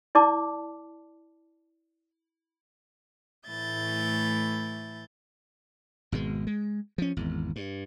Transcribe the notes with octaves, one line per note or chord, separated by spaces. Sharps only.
E4 D5 A5 D6
A2 E3 A3 E4 G6 A6
G#1 B2 G#3
G#3
F3 C#4
G#1 E2
G2